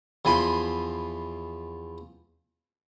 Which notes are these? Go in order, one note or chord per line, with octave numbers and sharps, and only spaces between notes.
E2 F3 G#5 B5 C6